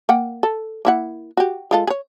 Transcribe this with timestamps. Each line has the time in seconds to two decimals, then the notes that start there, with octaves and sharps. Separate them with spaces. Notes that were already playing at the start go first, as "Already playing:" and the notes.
0.09 A#3 F#5 G5
0.43 A4
0.85 A#3 E4 F#5
1.37 F#4 G4
1.71 G#3 F4 A4
1.87 G#4 C#5